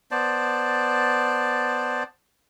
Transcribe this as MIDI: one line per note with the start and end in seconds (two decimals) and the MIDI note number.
0.11 2.03 59
0.11 2.03 72
0.11 2.03 74
0.11 2.03 81